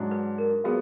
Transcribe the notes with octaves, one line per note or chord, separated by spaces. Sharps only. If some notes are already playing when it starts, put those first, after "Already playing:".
Already playing: G#2 F#3 D4
B4
A#4
F#3 B3 F4 G#4